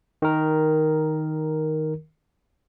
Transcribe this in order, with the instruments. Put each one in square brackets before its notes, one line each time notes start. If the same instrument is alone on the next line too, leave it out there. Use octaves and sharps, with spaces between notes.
[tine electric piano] D#3 A#4